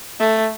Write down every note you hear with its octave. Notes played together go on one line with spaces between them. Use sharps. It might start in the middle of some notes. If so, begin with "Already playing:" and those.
A3